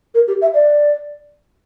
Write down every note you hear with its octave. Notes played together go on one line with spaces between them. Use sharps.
A#4
G4
E5
D5